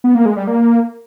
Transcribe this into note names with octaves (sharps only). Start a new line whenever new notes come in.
B3
A#3
G#3
G3
A#3